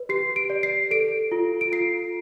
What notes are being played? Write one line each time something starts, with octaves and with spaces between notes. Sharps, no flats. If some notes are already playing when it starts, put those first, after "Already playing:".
Already playing: B4
G4 C7
D7
D5
C7
A4 D7
F4
D7
F4 C7